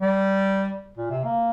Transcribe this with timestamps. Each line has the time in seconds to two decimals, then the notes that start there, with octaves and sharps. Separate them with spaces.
0.01 G3
0.97 A#2
1.10 C3
1.24 A#3